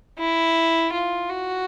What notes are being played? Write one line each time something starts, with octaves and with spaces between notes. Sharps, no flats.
E4
F4
F#4